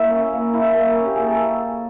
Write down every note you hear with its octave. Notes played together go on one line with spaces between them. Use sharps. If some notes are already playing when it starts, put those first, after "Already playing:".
Already playing: A#3 E4 E5
C#4
A#3
E4
A#3
C#4
G4
A#3 G#4
A4